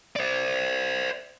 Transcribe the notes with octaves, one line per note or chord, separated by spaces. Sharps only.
C5 D5